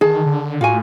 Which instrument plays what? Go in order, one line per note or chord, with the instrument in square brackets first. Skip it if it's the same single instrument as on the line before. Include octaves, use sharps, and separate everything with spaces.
[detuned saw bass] D#3 [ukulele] G#4 A5
[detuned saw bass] D3
[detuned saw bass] A2 [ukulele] F4 F#4 G#5